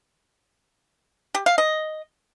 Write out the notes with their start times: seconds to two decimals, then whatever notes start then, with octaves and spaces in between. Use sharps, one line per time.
1.35 G4
1.46 F5
1.58 D#5